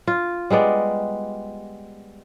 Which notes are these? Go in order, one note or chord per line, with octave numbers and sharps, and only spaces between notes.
F4
G3 G#3 B3 D5